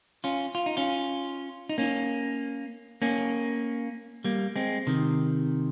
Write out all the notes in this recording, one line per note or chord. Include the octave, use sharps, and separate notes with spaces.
C#4 F4
F4
D#4
C#4 F4
D#4
A#3 C#4
A#3 C#4
G3 A#3
G#3 C4
C3 D#3